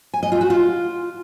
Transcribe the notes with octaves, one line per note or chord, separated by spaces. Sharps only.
G#5
D#5
F4
F#4
F4